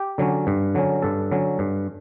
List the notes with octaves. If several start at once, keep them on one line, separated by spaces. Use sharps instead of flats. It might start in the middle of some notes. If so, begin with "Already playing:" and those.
Already playing: G4
D3 F#3 C#4
G2
D3 F#3 C#4
G2 A4
D3 F#3 C#4
G2